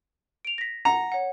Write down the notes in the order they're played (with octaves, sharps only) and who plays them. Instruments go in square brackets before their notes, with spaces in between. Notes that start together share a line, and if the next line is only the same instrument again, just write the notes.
[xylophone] D7 F7
A#6 B6
[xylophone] F#5 [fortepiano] A#5
[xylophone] C#5 F#5